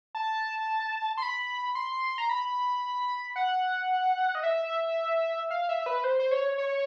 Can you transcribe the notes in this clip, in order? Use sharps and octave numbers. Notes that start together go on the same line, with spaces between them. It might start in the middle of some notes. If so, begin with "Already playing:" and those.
A5
C6
B5
C6
A#5
B5
F#5
D#5
E5
F5
E5
B4
C5
C5
C#5
C#5